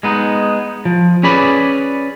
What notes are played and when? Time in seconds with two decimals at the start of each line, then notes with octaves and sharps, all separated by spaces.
0.03 G#3 B3 D#4
0.85 F3
1.23 C#4 G#4 B4 D5 B5